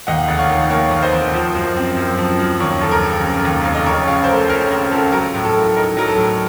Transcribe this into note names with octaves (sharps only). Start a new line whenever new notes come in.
D#2 D#5 F#5
F1 F#5
C#5 F5
D#3
A#3 C#5 F5
D#2 F5
C5 D#5
F1
F3
F#2
C4
F#2
F3
F#2
D#2 A#4 C#5
F1 A4
A#4
C#3
F1
D#2
F1 F5
D#5
C#3 A#4 C#5
C#2 C#5 F5
C5
A3 A#4
C#4 A#4
C#3 A#4
C#2 A4
F#3 A#4
A2
A4
A3
D#4 A#4
F#3 A#4
A4
A2